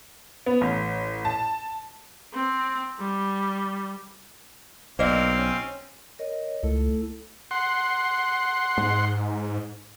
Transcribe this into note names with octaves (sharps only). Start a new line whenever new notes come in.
B3
A1
A5
C4
G3
B1 A#3 C4 C5 D5 D#5 F5
C#4
A#4 C#5 D#5
C#2 A3 E4 A4
F#5 C6
G#2